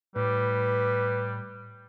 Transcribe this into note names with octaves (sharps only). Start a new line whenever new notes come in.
A2 G3 B4